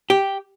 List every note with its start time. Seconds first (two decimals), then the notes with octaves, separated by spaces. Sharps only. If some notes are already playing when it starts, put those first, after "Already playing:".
0.10 G4